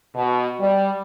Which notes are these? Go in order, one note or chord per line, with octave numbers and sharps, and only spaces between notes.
B2
G3